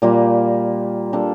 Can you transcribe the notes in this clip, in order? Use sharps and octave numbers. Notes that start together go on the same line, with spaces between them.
A#2 G3 A#3 F4
G3 A#3 D4 A4